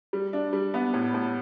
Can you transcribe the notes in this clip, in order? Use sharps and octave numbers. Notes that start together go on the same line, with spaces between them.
G3
D4
G3
B3
A2
A2